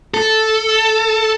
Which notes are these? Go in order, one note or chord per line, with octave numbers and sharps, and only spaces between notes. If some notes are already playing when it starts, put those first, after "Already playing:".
A4